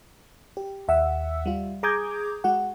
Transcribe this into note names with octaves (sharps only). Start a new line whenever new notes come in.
G4
D#2 E5 F#5 E6
G3 F4
G#4 A#5 D6 D#6 G6 G#6
G#3 F#4 F#5